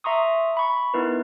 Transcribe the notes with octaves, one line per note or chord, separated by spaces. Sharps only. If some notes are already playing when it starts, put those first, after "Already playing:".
E5 A#5 C6 C#6 D#6
B5 C#6
B3 D#4 E4 A#4 B4